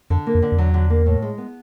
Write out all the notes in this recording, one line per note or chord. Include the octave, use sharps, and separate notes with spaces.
F2 D3
A#3
F2
D3
F2
E2 F#3
D3
A#3
A2
G#3
B3